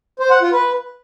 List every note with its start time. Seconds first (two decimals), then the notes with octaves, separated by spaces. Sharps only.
0.20 C5
0.31 F#5
0.42 F4
0.53 B4